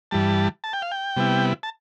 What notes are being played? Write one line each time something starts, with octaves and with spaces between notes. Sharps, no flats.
G2 E3 G3 A5
A5
G5
F5
G5
C3 G3 B3 E4
A5